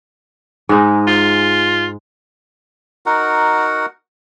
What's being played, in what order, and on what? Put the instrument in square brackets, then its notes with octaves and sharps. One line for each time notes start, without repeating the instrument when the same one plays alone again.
[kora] G#2 G#3 D#4
[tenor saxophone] F4
[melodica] D#4 F#4 A#4 F#5